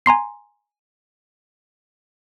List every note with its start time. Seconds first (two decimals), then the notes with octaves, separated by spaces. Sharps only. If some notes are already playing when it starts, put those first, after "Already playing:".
0.06 G#5 A#5 C6 C7